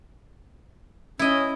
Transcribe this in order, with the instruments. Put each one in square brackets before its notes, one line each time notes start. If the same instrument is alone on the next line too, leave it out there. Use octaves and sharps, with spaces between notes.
[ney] C#4 [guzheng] E4 D#5